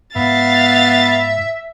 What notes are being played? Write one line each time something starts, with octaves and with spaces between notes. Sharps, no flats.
G#2 B3 E5 F5 A6